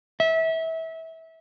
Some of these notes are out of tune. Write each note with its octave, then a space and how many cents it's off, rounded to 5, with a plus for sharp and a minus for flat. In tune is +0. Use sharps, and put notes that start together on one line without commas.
E5 -25